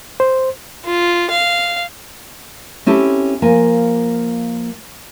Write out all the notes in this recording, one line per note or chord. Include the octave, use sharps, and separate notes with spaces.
C5
F4
F5
C4 C#4 E4 G4 A4
F3 A#3 G#5